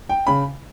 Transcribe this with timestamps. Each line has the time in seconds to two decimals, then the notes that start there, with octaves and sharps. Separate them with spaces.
0.09 G5
0.27 C#3 B5